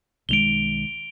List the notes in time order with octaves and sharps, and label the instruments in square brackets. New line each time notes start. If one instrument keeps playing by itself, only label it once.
[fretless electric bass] B1 D#3 G#3 [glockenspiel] D7 F7 G7